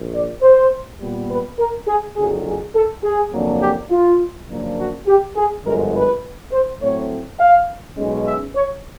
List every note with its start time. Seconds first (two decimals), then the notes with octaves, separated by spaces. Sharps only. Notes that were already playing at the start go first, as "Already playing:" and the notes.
Already playing: A#1
0.13 D5
0.42 C5
1.00 A#2 G3 B3
1.29 B4
1.59 A#4
1.87 G#4
2.17 F#1 F2 D3 F#3 G#4
2.46 G#4
2.75 A4
3.04 G#4
3.33 F2 C#3 F#3 A#3 D4
3.61 G4
3.90 F4
4.48 F#2 C#3 F3 A#3 D4
4.78 F#4
5.07 G4
5.37 G#4
5.64 G1 F#2 D3 F3 G#3 A#4
5.94 B4
6.52 C5
6.81 A2 F#3 A3 C4 C#5
7.39 F5
7.97 B1 B2 G#3 C#4
8.27 E5
8.55 C#5